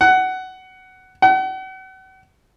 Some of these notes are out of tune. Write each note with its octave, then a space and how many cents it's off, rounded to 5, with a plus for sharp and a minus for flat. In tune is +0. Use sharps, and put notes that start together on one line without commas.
F#5 +15
F#5 +40